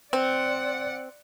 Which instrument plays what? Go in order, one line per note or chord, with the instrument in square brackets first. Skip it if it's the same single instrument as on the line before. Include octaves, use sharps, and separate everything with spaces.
[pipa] C4 [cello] D5 F#5